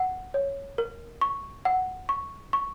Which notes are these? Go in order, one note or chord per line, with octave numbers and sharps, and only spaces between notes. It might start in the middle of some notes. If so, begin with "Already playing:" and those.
Already playing: F#5
C#5
A#4
C#6
F#5
C#6
C#6